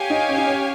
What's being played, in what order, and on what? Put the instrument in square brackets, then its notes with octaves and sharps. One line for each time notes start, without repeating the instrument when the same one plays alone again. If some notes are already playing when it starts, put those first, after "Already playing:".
Already playing: [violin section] G4 C#5 F5 G#5
[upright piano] D#4
C#4
D#4
C#4